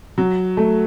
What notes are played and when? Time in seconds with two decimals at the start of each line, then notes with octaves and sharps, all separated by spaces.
0.18 F#3
0.57 A3